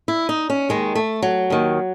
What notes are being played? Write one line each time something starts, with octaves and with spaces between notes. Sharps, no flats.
E4
D#4
C#4
D#2 D#3 G#3
A3
F#3
D#2 D#3